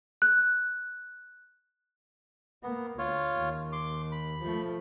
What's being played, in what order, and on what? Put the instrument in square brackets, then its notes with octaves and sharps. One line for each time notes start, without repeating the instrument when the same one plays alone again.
[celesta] F#6
[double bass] A#3 [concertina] B3
[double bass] D2 [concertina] F4 C#5
[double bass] D#2
[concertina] C6 D6
B5
[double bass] F3 A3